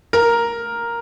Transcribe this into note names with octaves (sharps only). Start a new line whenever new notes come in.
A#4